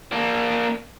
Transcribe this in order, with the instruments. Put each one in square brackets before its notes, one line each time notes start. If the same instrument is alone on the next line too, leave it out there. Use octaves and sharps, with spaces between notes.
[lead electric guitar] A#3 D4